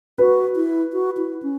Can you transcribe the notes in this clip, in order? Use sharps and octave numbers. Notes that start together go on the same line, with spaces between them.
F#4 B4
E4
F#4
E4
C#4